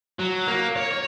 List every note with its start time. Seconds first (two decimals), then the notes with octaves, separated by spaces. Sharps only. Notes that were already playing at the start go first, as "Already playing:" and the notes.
0.19 F#3
0.48 A#3
0.76 C#5
0.91 C#5